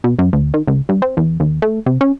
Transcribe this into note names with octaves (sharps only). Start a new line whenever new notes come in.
B2
F#2
D2
D#3
C#2
G2
C4
E2
D#2
A3
C3
C#4